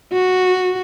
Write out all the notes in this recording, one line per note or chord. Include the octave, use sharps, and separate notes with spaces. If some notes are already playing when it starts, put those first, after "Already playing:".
F#4